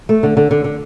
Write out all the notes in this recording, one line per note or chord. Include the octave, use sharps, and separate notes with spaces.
A3
D3
D3
D3
D3